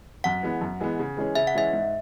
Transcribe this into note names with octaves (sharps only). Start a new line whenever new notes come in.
F#2 F#5
E3 G#3 B3
F#2
E3 G#3 B3
C#3
E3 G#3 C#4 G#4
C#3 E5
F#5
E3 G#3 C#4 G#4 E5
G#2